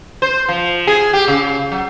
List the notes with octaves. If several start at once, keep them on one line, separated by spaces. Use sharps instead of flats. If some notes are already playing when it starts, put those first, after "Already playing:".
C5
F3
G#4
G4
C#3
F#3